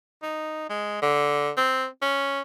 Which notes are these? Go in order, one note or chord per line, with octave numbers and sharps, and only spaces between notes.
D#4
G#3
D3
C4
C#4